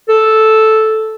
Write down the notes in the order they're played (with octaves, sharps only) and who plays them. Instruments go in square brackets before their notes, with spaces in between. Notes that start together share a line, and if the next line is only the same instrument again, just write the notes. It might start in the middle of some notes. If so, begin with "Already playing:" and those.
[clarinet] A4